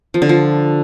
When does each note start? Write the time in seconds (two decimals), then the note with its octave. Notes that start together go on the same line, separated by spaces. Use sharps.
0.14 F3
0.22 D3
0.29 F3